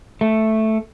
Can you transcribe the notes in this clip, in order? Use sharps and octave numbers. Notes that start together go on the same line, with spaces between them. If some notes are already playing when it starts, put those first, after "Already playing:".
A3